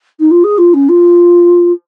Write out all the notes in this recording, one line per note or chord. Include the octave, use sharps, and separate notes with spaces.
D#4
F4
G#4
F4
C#4
F4